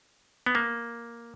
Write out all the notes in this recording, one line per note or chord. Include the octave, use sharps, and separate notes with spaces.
B3
A#3